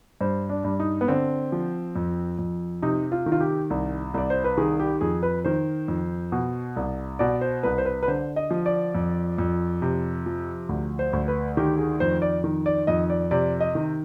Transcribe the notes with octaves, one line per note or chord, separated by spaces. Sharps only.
G2 C5
D4
G2
D#4
B3
D3 C4
F3
F2
F2
C3 D#4
F4
D#3
F4
G4
C2
C2 D5
C5
B4
D#3 G#4
G4
F2 G#4
B4
D#3 C5
F2
B2
C2
B2 D5
C5
C2 B4
C5
B4
B4
D3 C5
D#5
F3
D5
F2
F2
C3
F3
D2
C5
D2
B4
D#3 G4
G#4
F2 C5
D5
D#3
D5
F2 D#5
D5
C3 D5
D#5
D#3